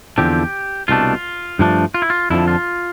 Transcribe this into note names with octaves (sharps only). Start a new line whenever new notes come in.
E2 D3 F3 C4 G4
C2 B2 A3 D4 F4
G2 F3 A3 D4
F4
E4
F4
F2 D3 F3 E4
F4